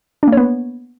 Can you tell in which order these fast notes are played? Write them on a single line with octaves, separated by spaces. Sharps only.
D4 A#3 C#5 B3